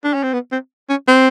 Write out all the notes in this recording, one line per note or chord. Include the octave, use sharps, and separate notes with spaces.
D4
C#4
C4
B3
C4
C#4
C4